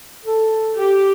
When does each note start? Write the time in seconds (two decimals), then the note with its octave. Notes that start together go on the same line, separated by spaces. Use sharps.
0.25 A4
0.77 G4